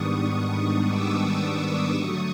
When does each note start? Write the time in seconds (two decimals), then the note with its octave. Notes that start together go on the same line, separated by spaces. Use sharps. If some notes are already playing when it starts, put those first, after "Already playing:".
Already playing: G#2 D#3 G3 B3 D4 C#6 D#6
0.33 C#6 D#6
0.86 D6 E6
1.39 D6 E6
1.93 D3 F#3 A3 C#6 D#6